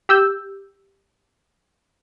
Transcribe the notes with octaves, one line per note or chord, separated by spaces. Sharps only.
G4 E6 G6